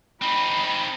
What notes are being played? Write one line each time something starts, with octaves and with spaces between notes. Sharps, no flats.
C4 D#4 B5